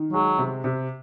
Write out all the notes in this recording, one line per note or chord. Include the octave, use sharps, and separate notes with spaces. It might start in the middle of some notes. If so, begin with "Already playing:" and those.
Already playing: D#3
F#3 G#3
C3
C3